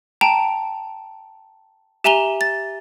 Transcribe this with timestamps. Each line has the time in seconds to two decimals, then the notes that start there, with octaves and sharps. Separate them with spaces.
0.21 G5 A5 A#5 D7
2.04 G4 E5 G#5 A#5 F7 G7
2.41 A6